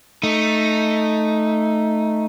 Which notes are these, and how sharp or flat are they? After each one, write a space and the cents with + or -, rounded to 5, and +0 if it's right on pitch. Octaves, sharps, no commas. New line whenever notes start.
A3 +0 D#4 +0